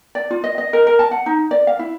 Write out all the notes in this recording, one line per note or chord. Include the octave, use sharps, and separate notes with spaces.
D5
F4
D#5
D#5
A#4
A#4
A5
F#5
D#4
D5
F5
E4